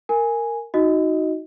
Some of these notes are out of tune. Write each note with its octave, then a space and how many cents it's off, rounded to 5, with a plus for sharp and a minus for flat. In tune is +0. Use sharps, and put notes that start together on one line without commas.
A#4 -10 G#5 +0
D#4 +20 F#4 +0 D#5 +10